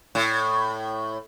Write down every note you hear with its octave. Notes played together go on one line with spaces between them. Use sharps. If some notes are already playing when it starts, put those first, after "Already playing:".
A2